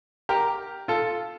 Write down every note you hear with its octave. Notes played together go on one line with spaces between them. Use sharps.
G4 A#4
F4 A4